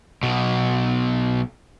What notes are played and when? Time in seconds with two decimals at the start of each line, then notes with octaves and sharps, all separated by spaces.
0.23 B1 B2